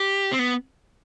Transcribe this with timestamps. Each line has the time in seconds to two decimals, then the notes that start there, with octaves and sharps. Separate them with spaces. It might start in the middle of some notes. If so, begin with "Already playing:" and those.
Already playing: G4
0.32 C4
0.39 B3